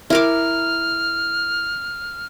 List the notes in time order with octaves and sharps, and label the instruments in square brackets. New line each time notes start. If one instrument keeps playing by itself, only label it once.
[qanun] E4 A#4 D6 [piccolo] F6